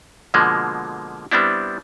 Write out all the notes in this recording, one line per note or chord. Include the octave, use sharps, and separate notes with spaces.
B2 D3 F3 G#3 A#3
G3 B3 C4 D4 E4